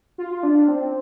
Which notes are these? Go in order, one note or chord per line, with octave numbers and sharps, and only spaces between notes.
F4
F4
D4
C4